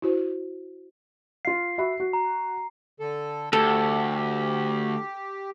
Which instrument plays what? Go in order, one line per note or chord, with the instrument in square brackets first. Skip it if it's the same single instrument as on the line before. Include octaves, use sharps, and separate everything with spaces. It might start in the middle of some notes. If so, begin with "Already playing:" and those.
[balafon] E4 F#4 C5
[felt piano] F4 F5 [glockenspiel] C7
[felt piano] F#4 E5 B5
F#4
[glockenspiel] A#5
[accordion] D3 A4
[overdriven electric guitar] D2 [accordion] G4 [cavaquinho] A4